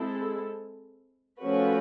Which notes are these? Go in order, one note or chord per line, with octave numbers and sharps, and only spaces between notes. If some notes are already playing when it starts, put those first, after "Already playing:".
Already playing: G#3 C4 E4 A4
F3 A3 C#4 F#4 B4